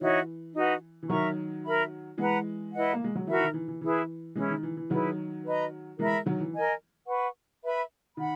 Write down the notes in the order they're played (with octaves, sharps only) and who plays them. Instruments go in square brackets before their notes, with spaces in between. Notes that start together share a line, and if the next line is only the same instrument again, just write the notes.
[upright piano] E3 [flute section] D#4 F#4 C#5 E5
[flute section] D#4 F#4 B4 F#5
[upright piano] E3
[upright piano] D#3 F#3 [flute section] A#4 E5 A#5 C#6
[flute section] A#4 E5 B5
[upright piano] E3 G#3 [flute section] B4 F#5 A#5
[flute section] E4 B4 D#5 F#5
[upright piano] A#3
G#3
F#3
[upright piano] E3 [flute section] F#4 A#4 E5 B5
[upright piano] D#3
E3
E3
[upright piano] E3 [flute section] E4 G#4 B4
[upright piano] E3 G#3 [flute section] C#4 E4 G#4
[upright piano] D#3
E3
E3
[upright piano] D#3 F#3 [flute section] E4 G#4 B4
[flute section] B4 D#5 A#5
[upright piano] E3 G#3 [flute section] A#4 E5 B5
[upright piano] D#3 F#3
E3
[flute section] A#4 D#5 G#5
B4 F#5 C#6
B4 E5 B5
[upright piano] D#3 [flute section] F#5 B5